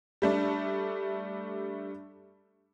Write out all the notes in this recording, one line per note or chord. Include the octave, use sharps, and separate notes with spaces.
G3 A3 D4